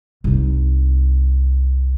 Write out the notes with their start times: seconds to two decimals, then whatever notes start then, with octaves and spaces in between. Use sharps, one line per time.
0.24 C2 D#4